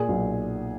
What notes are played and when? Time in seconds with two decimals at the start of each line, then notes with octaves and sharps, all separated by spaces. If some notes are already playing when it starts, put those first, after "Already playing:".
Already playing: A#2 G#4
0.09 B1